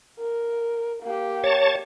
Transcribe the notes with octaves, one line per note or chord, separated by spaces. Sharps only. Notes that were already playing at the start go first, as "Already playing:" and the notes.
A#4
A#3 G4
C#5 A5